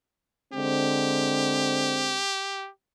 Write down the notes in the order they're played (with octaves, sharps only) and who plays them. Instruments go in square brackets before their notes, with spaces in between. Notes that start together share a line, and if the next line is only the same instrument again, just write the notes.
[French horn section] D3 G#3 C4 [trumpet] G4